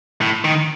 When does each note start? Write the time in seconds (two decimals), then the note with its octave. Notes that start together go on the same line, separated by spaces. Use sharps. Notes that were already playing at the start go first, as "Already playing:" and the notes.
0.21 A2
0.44 D#3